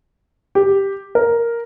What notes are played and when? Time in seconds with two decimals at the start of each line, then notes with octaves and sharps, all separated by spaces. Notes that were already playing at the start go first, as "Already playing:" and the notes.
0.55 G4
1.15 A#4